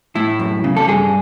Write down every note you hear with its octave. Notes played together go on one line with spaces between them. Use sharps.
A2 E4
F#2
C#3
A4
G2 G#4